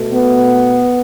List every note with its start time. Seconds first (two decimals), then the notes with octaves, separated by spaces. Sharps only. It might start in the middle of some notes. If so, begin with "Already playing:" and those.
Already playing: B2 A3
0.11 B3